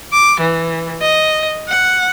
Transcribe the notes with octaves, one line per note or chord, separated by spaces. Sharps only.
D6
E3
D#5
F#5